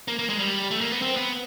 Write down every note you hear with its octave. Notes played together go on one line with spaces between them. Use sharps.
A#3
A#3
G#3
G3
A3
A#3
B3
C4
B3